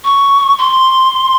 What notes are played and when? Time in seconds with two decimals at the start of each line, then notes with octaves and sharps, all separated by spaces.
0.05 C#6
0.58 C6